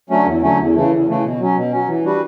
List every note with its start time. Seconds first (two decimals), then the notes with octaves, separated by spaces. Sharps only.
0.10 D3 F#3 A3 C#4
0.26 E2
0.42 D3 F#3 A3 C#4
0.59 E2
0.75 C#3 E3 A3
0.91 E2
1.08 C#3 E3 A3
1.24 B2
1.40 F#3 C#4
1.56 B2
1.72 F#3 C#4
1.88 E3
2.04 G3 D4 F#4 B4